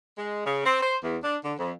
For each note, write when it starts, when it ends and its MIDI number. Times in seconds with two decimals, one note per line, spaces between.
0.18 0.44 56
0.45 0.61 49
0.65 0.78 60
0.82 0.96 72
1.03 1.16 40
1.23 1.37 62
1.44 1.52 50
1.58 1.71 41